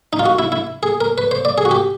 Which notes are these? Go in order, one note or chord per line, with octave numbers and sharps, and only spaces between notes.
D#4
F4
F#4
E4
E4
G#4
A#4
B4
C5
D5
G#4
F#4
G4